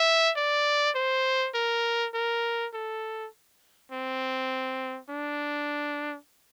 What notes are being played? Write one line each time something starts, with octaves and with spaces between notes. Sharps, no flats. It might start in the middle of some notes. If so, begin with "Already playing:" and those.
Already playing: E5
D5
C5
A#4
A#4
A4
C4
D4